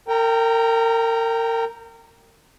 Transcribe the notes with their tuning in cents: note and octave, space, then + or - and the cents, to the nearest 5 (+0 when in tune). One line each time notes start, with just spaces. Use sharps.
A#4 -30 G5 +0 A#5 +10